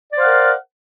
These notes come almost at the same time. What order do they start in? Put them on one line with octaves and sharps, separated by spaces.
D5 C5 F5 F#5 A#4